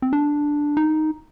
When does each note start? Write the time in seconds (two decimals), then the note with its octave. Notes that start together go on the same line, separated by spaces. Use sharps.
0.02 C4
0.13 D4
0.77 D#4